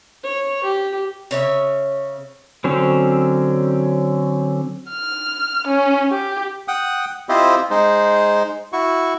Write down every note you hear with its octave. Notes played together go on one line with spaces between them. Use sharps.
C#5
G4
C#3 C#5 E5
D3 F#3 C4 C#4
F6
C#4
G4
F#5 G5 D#6
C4 E4 F4 G4 C5 D#5
G#3 D#4 C5
E4 F#4 C#6